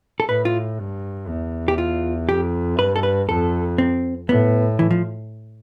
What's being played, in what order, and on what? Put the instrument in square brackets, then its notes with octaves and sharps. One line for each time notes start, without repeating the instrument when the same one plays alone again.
[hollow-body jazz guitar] A4
[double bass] A2 [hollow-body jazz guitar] B4
[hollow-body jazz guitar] F4
[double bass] G2
E2
[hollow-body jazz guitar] G4
F4
[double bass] F2 [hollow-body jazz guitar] G4
[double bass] G2 [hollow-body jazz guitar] B4
[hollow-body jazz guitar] A4
B4
[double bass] F2 [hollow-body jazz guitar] A4
[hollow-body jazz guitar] C4
[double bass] A2 [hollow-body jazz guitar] B3
[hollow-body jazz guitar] E3
F3